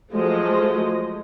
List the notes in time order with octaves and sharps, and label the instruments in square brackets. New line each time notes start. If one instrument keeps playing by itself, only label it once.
[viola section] F3 F#3 G#3 A3 D#5